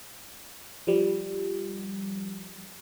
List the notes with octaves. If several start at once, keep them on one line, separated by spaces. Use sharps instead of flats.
F3 G3